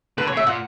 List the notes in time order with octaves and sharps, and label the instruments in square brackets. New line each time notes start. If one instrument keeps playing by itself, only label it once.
[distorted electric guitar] D3 [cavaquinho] B4
[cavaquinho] C#5
[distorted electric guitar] C#3 [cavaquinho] E5
[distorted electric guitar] A#2 [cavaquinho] F#5